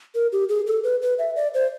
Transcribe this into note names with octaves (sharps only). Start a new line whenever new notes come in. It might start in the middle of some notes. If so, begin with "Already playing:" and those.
A#4
G4
G#4
A4
B4
B4
E5
D5
C5